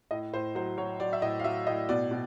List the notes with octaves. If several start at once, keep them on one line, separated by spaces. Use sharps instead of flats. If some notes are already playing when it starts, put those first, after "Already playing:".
A2 D#5
A2 C5
F#3 C5
F#3 C#5
F#3 D5
E5
A2 D#5
F5
F#3 E5
A2 D#5
B2 D5
B2